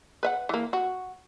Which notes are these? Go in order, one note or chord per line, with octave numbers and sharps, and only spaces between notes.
B4 E5 F#5
E3 A#3
F#4